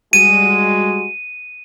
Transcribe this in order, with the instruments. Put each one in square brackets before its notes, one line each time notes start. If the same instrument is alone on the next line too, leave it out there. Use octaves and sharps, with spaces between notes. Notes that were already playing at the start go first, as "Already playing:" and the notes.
[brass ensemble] G3 G#3 F#4 [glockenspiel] D#7